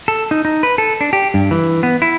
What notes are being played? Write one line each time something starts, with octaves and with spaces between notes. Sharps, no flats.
A4
D#4
D#4
B4
A4
D4
G4
G2
E3
B3
E4